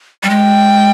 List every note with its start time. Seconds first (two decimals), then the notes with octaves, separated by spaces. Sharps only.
0.23 G3
0.29 G#3 G5